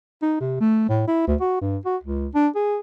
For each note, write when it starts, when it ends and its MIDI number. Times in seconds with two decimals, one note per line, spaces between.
0.23 0.38 63
0.40 0.58 48
0.61 0.85 57
0.89 1.04 45
1.08 1.26 64
1.27 1.35 38
1.41 1.58 66
1.61 1.77 43
1.85 1.97 66
2.03 2.27 37
2.34 2.48 62
2.56 2.78 68